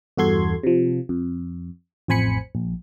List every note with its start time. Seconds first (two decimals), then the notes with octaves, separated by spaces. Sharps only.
0.17 E2 G2 F#4 A4 C6 G#6
0.63 C3 F3
1.09 F2
2.08 A1 F2 C5 G#5 B5 C#7
2.55 A#1